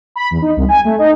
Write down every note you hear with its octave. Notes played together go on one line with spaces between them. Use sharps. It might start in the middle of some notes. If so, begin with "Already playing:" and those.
B5
E2
D#4
C2
G#5
A3
D#4